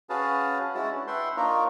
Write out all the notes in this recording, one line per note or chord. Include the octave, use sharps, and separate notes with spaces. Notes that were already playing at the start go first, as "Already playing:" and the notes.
C#4 F#4 G#4 B4 F5 A5
G#3 C#4 E4 F#4 A5
D4
B4 E5 F#5 G5 C6
A#3 D4 D#4 F4 A#4 C#5